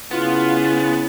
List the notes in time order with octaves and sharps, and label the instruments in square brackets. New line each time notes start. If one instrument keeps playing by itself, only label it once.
[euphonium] C#3 [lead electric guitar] B3 [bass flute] E4 [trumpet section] F4